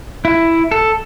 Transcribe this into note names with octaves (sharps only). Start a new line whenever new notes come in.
E4
A4